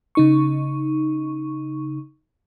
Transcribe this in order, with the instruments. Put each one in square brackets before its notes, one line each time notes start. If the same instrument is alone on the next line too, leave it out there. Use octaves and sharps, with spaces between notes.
[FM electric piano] C#3 D#4 C#6